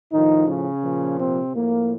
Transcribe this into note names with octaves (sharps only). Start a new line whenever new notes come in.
A2 D#3 F3 D#4
C#3 C#4
A#2 F3
C3 C4
A2 F3 A#3